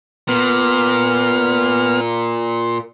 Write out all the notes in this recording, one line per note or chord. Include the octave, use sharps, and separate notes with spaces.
A#2 B3 F6